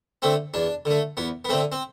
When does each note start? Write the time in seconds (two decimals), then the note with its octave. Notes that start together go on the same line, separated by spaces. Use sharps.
0.22 D3 A3 C4
0.54 E2 D4
0.85 D3 A3
1.17 E2 B3
1.45 B3
1.49 D3 A3 C4
1.72 C4